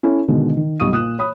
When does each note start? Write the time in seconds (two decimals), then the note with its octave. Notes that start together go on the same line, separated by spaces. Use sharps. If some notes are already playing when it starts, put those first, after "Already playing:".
0.03 C#4 E4 A4
0.28 B2 D3 D#3 G#3
0.57 D#3
0.80 B1 G3 C#6 D#6 D#7
0.92 A#2 D#6 F#6 E7
1.19 C#5 B5 D#6